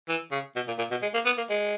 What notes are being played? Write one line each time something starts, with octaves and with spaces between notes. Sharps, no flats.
E3
C#3
B2
A#2
A#2
B2
G#3
A#3
B3
A#3
G#3